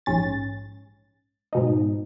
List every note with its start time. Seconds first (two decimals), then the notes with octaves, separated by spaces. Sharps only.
0.06 A#1 G#2 C#4 A6
1.53 G#2 B2 D#4